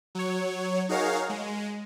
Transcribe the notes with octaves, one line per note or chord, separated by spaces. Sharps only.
F#3 C#5
D#4 F#4 G#4 A#4 C#5 F5
G#3